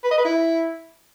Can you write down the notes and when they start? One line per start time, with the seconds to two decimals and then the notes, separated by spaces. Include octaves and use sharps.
0.04 B4
0.11 D#5
0.18 B4
0.25 E4